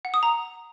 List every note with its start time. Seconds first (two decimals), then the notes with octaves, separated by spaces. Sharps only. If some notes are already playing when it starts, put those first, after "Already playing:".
0.05 F#5
0.14 D#6
0.23 A#5